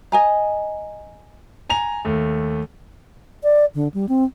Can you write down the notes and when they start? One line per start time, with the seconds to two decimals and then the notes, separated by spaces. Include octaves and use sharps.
0.12 D#5 G#5 A#5
1.70 G#5 A#5 F7
2.05 D#2 A3
3.43 D5
3.75 D3
3.94 G3
4.09 C4